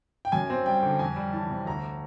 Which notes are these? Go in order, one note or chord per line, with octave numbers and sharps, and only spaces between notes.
G5
F#2 G#5
C4
G3 G5
D3
F2 G#5
G3
E3 A5
C3
D2 A#5